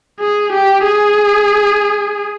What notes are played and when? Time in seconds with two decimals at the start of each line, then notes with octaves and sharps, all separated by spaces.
0.20 G#4
0.53 G4
0.85 G#4